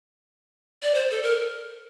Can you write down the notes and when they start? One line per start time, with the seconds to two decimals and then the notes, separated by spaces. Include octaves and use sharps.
0.83 D5
0.94 C5
1.11 A4
1.23 A#4